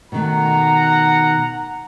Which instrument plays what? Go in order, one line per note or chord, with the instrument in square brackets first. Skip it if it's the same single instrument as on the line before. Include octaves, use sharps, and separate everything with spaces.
[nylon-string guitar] B2 D#3 A3 [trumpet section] F#5 A#5